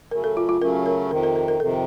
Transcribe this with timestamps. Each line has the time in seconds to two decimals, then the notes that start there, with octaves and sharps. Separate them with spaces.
0.11 C#3 F#3 A3 C#4 A#4
0.24 A4
0.37 F4
0.49 F4
0.61 C#3 F#3 A3 C#4 A#4
0.86 A#4
1.11 F2 C3 D#3 A#4
1.23 A#4
1.35 A#4
1.48 A#4
1.60 F2 C3 D#3 A4